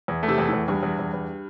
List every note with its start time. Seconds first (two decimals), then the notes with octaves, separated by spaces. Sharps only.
0.08 E2
0.23 A3
0.28 C3
0.38 E2
0.48 E2 A2
0.68 E2 G2
0.83 E2
0.99 E2
1.13 E2